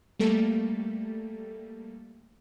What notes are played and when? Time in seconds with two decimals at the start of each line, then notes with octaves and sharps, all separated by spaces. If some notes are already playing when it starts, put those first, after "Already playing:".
0.19 G3 A3 A#3 A4